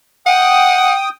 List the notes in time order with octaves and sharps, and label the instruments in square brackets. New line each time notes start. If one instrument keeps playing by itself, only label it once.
[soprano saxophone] F#5 [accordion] G5 D#6